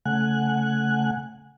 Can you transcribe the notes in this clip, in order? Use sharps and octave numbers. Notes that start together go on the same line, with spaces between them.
C#3 A3 F#5 G#5 F#6